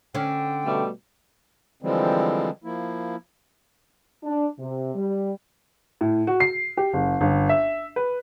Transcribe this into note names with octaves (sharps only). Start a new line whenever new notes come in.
D3 C#4 G5
B2 G3 A3
D3 E3 F3 G3 G#3 C4
F3 A#3 E4
D4
C3
G3
A2
F#4
C7
G4
F#1
G1
E5
B4